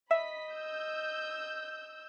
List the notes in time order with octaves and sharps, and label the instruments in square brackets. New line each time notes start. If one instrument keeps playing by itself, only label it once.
[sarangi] D#5 [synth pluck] E5 [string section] B5 B6
[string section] E6 G6